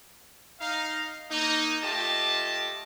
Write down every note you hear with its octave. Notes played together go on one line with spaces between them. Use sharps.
D#4 F5
A#3 D#4
A3 F4 G4 D#5 A5